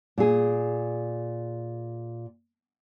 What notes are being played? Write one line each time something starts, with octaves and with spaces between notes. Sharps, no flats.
A#2 G#4